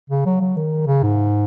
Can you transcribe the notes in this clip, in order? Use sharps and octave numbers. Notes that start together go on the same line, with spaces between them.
C#3
F#3
F#3
D#3
C#3
G#2